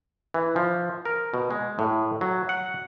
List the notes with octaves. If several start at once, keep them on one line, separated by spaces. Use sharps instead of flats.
E3
F3
A#4
B2
G#3
A2
F#3
F#5